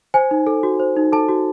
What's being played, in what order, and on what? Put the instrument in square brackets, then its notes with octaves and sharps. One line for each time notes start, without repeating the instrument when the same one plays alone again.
[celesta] C5 G#5
D#4
A4
F#4
C5
D#4
A4 A5
F#4